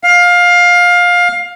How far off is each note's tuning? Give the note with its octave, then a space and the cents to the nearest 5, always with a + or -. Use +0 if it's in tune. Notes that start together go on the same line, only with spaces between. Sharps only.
F5 +20